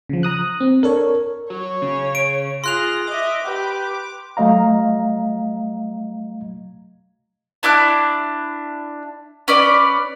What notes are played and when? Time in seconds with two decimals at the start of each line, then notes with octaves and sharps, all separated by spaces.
0.09 C#3 F3
0.23 A#5 D#6 F#6
0.60 C4
0.83 D4 A4 A#4 C#5
1.50 F#3 C#5
1.82 C#3
2.15 D7
2.64 F4 G#4 C6 F#6 A#6 F7
3.07 D#5 E5 D6
3.44 G4 B4
4.37 F#3 A3 D#5 F5 A#5
7.63 D4 E4 D6 F#6
9.48 C#4 B4 D5